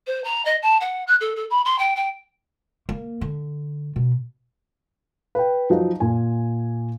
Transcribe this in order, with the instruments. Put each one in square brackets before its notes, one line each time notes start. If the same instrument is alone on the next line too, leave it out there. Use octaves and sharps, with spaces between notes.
[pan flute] C5
A#5
D#5
A5
F#5
F#6
A4
A4
B5
C6
G5
G5
[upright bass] A#3
D3
B2
[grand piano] B4 G5
F3 F#3 D#4
A#2 G#5